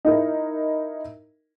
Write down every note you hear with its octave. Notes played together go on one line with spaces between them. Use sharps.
D#4 E4 A#4